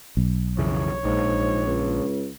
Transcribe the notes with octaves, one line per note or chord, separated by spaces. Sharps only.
B1
F2 C#3 E3 C#5
A#1 G#2
C#2